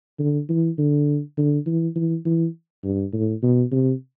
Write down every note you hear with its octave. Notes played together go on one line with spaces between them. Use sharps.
D3
E3
D3
D3
E3
E3
E3
G2
A2
B2
C3